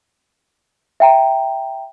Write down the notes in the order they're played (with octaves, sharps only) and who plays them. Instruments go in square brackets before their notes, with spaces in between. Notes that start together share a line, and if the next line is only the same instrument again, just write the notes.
[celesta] E5 G5 A#5